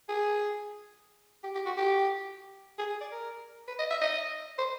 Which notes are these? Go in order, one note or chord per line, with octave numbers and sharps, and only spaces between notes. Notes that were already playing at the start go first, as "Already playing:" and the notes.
G#4
G4
G4
F#4
G4
G#4
G#4
D5
A#4
B4
D#5
E5
D#5
C5